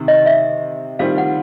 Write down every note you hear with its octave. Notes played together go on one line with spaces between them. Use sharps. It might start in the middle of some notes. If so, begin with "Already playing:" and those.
Already playing: C3 D#3
D#5
E5
D#3 G3 C4 F4 F5
F#5